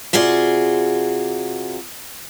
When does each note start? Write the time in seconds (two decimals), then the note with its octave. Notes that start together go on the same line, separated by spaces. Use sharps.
0.13 C3 F4 F#4 G#4 D5